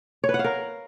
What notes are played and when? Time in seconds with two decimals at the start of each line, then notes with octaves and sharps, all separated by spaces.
0.24 C#5
0.29 B4
0.34 F#5
0.39 F5
0.44 A#4